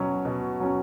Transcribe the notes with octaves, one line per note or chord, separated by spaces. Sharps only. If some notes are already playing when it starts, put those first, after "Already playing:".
Already playing: B2 F#3 C#4
B2
F#3 C#4